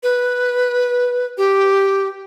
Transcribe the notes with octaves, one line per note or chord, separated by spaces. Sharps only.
B4
G4